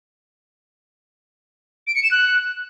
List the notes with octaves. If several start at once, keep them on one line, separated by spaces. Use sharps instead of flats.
D7
C#7
E7
F#6